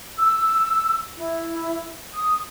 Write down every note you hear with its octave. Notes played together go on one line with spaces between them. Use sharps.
E6
E4
D#6